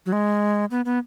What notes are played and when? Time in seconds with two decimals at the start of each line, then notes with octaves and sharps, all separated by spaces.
0.06 F#3
0.12 G#3
0.71 B3
0.85 B3